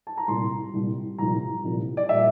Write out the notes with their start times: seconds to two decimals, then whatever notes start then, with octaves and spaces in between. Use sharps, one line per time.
0.07 A5
0.17 A#5
0.28 C2 A#2 G3 C6
0.73 C2 A#2 G3
1.18 C2 A#2 F3 A#5
1.64 C2 A#2 F3
1.97 D5
2.09 A#2 G3 E5